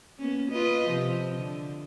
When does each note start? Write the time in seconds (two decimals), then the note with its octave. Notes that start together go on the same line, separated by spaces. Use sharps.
0.19 A#3 B3 C#4
0.51 F4 B4 D#5
0.86 C3 F3
1.35 D3